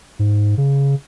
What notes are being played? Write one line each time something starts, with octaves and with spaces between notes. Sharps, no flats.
G#2
C#3